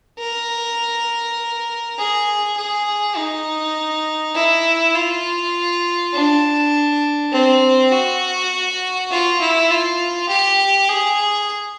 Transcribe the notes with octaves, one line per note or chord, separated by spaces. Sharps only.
A#4
G#4
G#4
D#4
E4
F4
D4
C4
F#4
F4
E4
F4
G4
G#4